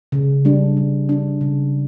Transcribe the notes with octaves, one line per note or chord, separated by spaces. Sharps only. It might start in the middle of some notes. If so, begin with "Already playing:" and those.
C#3
G3 D4
C#3
G3 D4
C#3